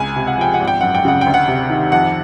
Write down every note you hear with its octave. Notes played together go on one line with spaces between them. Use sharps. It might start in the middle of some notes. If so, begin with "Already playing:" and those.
Already playing: C#2 G#5
C3
F#5
F3 G5
F#5
G#1
G5
F#2 F#5
G5
C#3 F#5
G5
D2
F#5
C3
D#3
F2 F#5